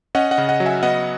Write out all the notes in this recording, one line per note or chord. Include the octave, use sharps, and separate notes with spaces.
C#4 D#5 F#5
D#5 F#5
C#3
D#5 F#5
F#3
E5 G#5
B3 D#5 F#5